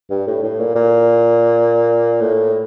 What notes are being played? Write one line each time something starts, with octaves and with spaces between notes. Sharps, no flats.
G2
A2
A2
A#2
A#2
A2